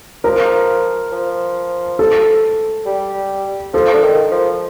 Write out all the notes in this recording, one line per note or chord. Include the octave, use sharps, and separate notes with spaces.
F3 A#4
F3
A4
G3
F3 A4
D3
D#3
F3